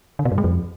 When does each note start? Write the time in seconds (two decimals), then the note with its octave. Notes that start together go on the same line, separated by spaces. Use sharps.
0.19 D3
0.25 B2
0.32 G2
0.38 G#3
0.44 F2